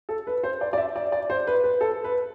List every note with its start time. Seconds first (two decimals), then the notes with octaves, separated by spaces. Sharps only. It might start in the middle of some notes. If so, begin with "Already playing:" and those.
0.09 A4
0.27 B4
0.43 C5
0.61 D5
0.73 D5
0.78 E5
0.96 D5
1.12 D5
1.30 C5
1.47 B4
1.64 B4
1.81 A4
2.04 B4